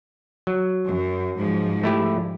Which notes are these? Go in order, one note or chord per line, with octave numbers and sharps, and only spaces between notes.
F#3
F#2
G#2 F3
A3 E4 G4